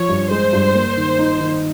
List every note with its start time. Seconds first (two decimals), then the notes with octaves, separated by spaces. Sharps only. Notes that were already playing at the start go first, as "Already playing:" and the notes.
Already playing: F3 F4 C#5
0.09 G2
0.31 G#3 C5
0.53 G2
0.75 A#3
0.97 D#3
1.19 D#4
1.41 D#3